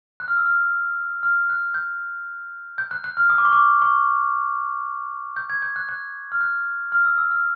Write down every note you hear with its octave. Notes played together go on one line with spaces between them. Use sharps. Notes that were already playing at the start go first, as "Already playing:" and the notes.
F#6
F6
E6
F6
F6
F#6
G6
G6
F#6
F#6
F6
D#6
D6
C#6
D6
C#6
G6
G#6
G6
F#6
F#6
F6
F#6
F6
E6
E6
F6